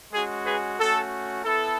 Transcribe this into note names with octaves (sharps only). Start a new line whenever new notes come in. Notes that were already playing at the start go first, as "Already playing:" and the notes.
G#3 C#4 F#4 G#4
G#4 B4
A3 C#4 F#4 A4
B3 E4 A4